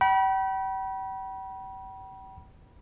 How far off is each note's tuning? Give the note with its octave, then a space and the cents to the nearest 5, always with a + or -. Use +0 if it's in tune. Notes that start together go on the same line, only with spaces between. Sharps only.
G5 -40 B5 -35